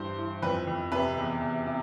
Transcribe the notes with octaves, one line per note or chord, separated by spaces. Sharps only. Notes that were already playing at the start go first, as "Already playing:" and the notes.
Already playing: G2 E3 C5
E3
F2 B4
F2
C3 B4
E2
E2
C3